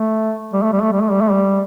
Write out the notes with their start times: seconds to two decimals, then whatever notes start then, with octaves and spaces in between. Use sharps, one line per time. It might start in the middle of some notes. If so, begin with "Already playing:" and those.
Already playing: A3
0.53 G3
0.62 A3
0.73 G3
0.82 A3
0.92 G3
1.02 A3
1.11 G3
1.21 A3
1.31 G3